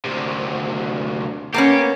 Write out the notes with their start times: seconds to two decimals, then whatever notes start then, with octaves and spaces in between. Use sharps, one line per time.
0.05 D2 C3
1.54 A#3 B3 C#4 G4